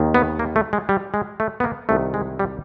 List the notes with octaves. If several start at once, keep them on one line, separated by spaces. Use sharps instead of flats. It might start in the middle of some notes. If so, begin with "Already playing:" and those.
Already playing: D#2 D#3
B3
A#3
A3
G#3
G3
G#3
A3
B3
A#3
C2 C3 D#3 A3
G#3
G3